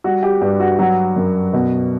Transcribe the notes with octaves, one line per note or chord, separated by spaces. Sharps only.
G3 F#4
G4
G2 G4
F#4
F#3 F#4
F#2
B2